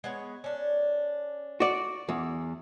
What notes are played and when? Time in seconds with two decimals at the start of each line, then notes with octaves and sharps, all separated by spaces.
0.04 G#3 B3 C#5
0.44 C#4 D4
1.60 F#4 D5
2.09 E2